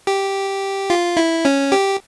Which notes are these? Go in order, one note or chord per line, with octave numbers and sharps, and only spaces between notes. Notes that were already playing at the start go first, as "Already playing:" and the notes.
G4
F4
E4
C#4
G4